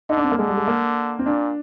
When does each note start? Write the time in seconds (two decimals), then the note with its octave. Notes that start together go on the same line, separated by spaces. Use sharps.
0.09 D3 D#4
0.17 D4
0.24 C4
0.32 A#3
0.38 D3 G#3
0.48 G3
0.57 G#3
0.68 A#3
1.19 C4
1.25 A#2 D4